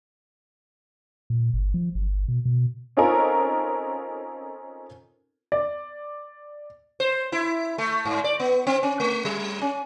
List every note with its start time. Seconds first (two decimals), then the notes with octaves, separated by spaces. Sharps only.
1.30 A#2
1.54 G1
1.74 F3
1.95 G1
2.28 B2
2.45 B2
2.97 C4 C#4 D#4 F4 A4 A#4
5.52 D5
7.00 C5
7.32 E4
7.78 A3
8.05 G#2
8.24 D5
8.40 B3
8.67 C4
8.83 C#4
9.00 A3
9.25 G3
9.61 C#4